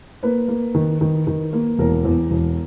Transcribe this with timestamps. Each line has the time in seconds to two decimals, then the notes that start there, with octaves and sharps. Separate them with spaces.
0.23 A#3 B4
0.48 A#3
0.75 D#3
1.01 D#3
1.27 D#3
1.53 A#3
1.78 E1 A#4
2.05 E2
2.31 E1